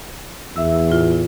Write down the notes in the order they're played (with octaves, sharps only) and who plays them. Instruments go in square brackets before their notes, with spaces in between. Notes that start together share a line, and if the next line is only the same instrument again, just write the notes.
[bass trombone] E2 [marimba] E5 E6
[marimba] A2 F4